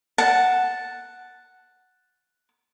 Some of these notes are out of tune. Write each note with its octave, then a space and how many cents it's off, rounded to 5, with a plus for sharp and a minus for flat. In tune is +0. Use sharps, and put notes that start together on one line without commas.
F#5 +0 A5 +0